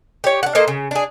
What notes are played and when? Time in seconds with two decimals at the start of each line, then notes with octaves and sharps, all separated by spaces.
0.24 G4 C#5
0.43 D4 F#5
0.55 A#3 A4 C5 D#5
0.68 C#3
0.91 D4 G#4